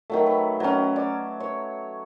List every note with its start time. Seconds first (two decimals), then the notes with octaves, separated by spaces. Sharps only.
0.10 D#3 F#3 A3
0.26 B4
0.60 F#3 C#4
0.96 D5
1.40 C#5